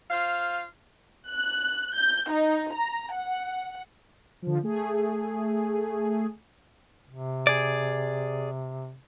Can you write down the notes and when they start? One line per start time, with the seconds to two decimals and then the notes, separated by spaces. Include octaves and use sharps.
0.11 F4 C5 F5
1.29 F#6
1.94 G6
2.30 D#4
2.73 A#5
3.13 F#5
4.42 D3 F3
4.63 A3 G#4
7.09 C3
7.47 G#4 D5